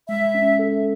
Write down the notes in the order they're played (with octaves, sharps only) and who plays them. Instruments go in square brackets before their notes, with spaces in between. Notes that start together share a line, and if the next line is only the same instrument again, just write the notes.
[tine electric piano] G#3 [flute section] E5
[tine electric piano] C#4
A4